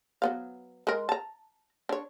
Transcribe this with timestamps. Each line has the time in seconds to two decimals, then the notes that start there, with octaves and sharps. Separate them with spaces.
0.22 F#3 B3 F5
0.87 G#3 A#4
1.09 A5 A#5
1.89 D4 C#5